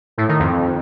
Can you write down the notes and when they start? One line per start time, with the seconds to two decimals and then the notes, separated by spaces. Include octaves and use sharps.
0.18 A2
0.28 D#3
0.39 F2